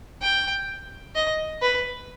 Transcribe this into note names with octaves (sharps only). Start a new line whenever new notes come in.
G5
D#5
B4